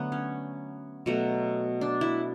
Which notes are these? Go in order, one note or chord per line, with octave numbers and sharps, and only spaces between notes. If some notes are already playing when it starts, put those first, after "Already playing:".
Already playing: D3 F#3 A3 B3
C#4
B2 F#3 A3
D4
E4